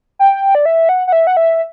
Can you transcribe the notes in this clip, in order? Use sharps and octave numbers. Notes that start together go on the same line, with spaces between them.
G5
D5
E5
F#5
F#5
E5
F#5
E5